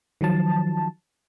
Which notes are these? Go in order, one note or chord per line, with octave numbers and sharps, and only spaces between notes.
D#3 F3 F#3 A5